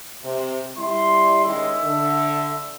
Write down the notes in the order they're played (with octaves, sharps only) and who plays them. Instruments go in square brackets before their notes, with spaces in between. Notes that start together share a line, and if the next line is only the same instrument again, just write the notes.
[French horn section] C3
[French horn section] G3 E4 [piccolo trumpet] C6
[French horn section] D#3 G#3 C#4 [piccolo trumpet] E5
[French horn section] D3